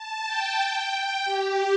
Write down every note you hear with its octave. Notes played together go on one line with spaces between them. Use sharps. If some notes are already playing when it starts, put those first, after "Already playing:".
Already playing: A5
G5
G5
G5
G4